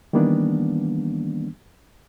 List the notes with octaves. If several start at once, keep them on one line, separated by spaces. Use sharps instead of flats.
D#3 E3 G3 A#3 B3 D4